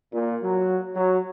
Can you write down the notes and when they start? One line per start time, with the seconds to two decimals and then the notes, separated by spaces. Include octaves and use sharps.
0.13 A#2
0.43 F#3
0.95 F#3